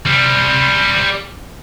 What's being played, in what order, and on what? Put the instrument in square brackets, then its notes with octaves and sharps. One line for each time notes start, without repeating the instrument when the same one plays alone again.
[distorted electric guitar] G3 C4